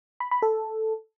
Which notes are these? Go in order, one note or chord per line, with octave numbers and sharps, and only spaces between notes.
B5
B5
A4